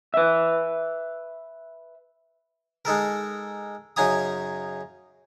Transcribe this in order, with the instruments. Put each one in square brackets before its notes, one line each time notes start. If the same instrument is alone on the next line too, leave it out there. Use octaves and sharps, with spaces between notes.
[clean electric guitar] B4 E5
[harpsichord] G#3 D#4 A4 A#4
F#2 C#3 D#4 G#5 A#5 D#6